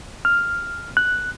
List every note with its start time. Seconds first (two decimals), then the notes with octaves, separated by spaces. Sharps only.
0.25 F6
0.97 F#6